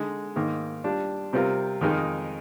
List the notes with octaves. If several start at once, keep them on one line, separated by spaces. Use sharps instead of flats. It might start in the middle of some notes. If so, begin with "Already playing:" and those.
Already playing: D3 G#3 D#4
G#2 D#3 A#3
G3 D4 F4
C3 G3 C4 F4 A#4
F2 D#3 G#3 D#4 A#4